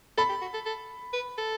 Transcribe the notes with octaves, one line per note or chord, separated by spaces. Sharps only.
A4 B5
G4
F#4
A4
A4
B4
A4